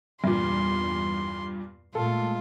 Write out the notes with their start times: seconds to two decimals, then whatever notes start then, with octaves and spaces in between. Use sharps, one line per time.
0.24 E2 G2 A#2 C6
1.95 A#2 G#3 A3 F4 A4